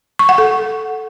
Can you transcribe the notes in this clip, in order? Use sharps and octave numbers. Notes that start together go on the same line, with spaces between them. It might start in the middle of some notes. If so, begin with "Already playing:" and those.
C#6
F#5
A4